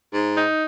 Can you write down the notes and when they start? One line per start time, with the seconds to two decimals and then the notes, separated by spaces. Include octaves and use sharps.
0.14 G#2
0.34 D#4